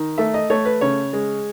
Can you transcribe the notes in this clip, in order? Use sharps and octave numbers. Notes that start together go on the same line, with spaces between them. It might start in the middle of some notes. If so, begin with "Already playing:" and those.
Already playing: D#3
A3 E5
D#5
A3 C#5
B4
C#3 C#5
G#3